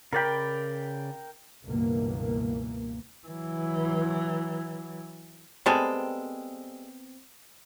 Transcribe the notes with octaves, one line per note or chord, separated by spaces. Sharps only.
C#3 A#4 D5 G5 B5
C#2 G2 B2 E3 A#3
E3 F#3
G3 G#3 B3 C4 A4